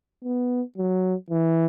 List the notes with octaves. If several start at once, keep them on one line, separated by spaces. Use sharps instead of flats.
B3
F#3
E3